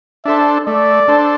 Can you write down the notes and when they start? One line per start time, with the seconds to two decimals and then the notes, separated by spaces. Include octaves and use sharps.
0.25 D4 A4 C5 E5
0.67 A3 D5
1.08 D4 A4 C5